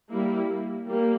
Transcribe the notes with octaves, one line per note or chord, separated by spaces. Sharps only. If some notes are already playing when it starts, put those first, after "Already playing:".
G3 A#3 E4
G3 A#3